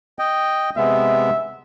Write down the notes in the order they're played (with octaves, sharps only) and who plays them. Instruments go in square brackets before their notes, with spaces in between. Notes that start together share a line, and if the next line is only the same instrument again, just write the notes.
[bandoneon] D#5 G5
[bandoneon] C3 G#3 B3 [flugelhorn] E5